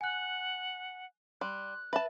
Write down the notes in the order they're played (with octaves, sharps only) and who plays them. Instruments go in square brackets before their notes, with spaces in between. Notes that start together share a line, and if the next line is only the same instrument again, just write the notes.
[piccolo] F#5 [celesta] G#5 F#6
[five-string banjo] G3 [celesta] C6 [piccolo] F#6
[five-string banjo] B4 A5 [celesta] E5